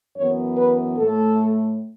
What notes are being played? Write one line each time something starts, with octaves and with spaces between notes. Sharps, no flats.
F#2 E3 B3 C#5
B4
A2 A3 A4